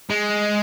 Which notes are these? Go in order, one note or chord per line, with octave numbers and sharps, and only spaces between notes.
G#3